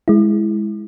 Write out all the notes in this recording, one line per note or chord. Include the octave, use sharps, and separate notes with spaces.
G#3 E4